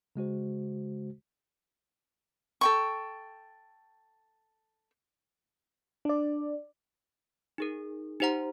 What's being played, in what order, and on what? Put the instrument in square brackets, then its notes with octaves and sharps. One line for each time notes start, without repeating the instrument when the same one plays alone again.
[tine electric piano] C#3 G#3 F#4 C5
[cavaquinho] A4 G5 C#6
[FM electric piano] D4 D5
[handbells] D#4 G#4 A#4
D#4 G4 C5 F#5 A#5